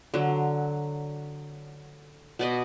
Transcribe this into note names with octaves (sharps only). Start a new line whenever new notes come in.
D3 F#3
B2 D5 D#5